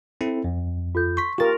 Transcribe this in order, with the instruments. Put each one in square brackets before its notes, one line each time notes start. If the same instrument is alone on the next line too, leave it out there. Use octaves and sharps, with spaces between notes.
[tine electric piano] C4 E4 A4
F2
[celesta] F4 A4 G6
[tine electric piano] C6 B6 [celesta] C#6
[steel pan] F4 A#4 [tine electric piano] G4 A6